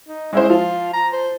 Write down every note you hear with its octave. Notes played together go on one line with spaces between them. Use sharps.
D#4
G#3 C#4 E4 C5
F3 F4
A#5
C5